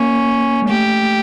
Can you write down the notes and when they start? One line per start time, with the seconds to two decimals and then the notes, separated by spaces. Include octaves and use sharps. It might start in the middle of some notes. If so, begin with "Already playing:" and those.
Already playing: A#3 C#4
0.62 G#3
0.69 A3 G4